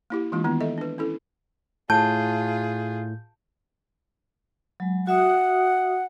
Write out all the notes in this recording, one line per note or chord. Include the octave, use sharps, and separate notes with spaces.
A#3 E4 G4
E3 G#3 A#3 D4 F4
D#3 B3 E4
A4 D#5 E5
D4 B4
C#4 E4 A4
A2 F4 G#4 A5 G6
F#3 G#3
F#4 E5 F#5 D#6